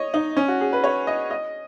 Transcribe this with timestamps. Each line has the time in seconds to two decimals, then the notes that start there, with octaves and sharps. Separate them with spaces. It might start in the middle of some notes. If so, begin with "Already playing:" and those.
Already playing: C#5 D#5
0.14 D#4
0.37 C#4
0.48 F#4
0.61 G#4
0.73 B4
0.84 C#5
1.07 D#5
1.31 D#5